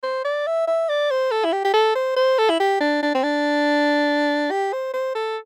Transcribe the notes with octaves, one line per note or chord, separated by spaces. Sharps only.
C5
D5
E5
E5
D5
C5
A4
E4
G4
G4
A4
C5
C5
A4
E4
G4
D4
D4
C4
D4
G4
C5
C5
A4